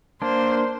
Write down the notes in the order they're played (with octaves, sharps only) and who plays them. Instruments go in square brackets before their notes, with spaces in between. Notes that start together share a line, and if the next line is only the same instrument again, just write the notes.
[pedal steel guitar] A#3 D4 [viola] C5